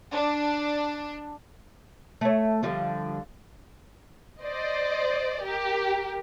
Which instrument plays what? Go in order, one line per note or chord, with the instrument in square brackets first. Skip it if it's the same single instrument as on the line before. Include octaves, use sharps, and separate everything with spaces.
[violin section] D4
[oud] A3 C#5
D3 F3 G3
[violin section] C5 D5 D#5
G4 A#4